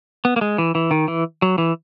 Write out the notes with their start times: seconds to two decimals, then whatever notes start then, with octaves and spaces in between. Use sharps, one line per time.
0.25 B3
0.36 A#3
0.41 G#3
0.58 E3
0.75 E3
0.91 D#3
1.08 E3
1.42 F#3
1.58 E3